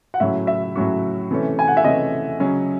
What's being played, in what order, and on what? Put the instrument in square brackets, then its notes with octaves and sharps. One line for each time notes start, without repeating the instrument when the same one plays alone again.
[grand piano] F#5
[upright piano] A2 F#3 C#4 F#4 [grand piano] E5
[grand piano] E5
[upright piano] A2 F#3 C#4 F#4
C3 E3 A3 C#4
[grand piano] G#5
F#5
E5
[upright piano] C3 E3 A3 C#4 [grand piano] D#5
[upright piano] C#3 F#3 C#4